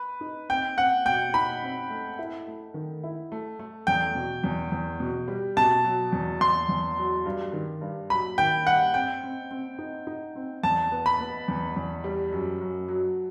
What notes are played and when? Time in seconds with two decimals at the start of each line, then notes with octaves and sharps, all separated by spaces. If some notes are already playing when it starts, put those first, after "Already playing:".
Already playing: B4
0.21 D#4
0.49 C4 G5
0.78 C4 F#5
1.06 B2 G5
1.34 D#4 B5
1.62 C4
1.90 A3
2.19 E4
2.47 A3
2.74 D#3
3.03 E4
3.32 A3
3.59 A3
3.87 E2 G5
4.15 B2
4.44 E2
4.71 E2
5.00 B2
5.28 G3
5.57 B2 A5
5.85 F#3
6.12 E2
6.40 E2 C6
6.69 E2
6.98 F#3
7.26 G2
7.53 D#3
7.81 G2
8.10 F#3 B5
8.38 D#3 G5
8.66 G2 F#5
8.94 C4 G5
9.23 C4
9.51 C4
9.79 D#4
10.07 D#4
10.35 C4
10.63 E2 A5
10.92 B3
11.06 B5
11.21 B3
11.48 E2
11.76 E2
12.04 G3
12.32 F#2
12.61 F#2
12.88 F#3